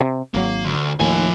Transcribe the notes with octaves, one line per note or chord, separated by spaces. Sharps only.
C3
G#1 F#3 A#3
D2
D#2 A2 F3 G#5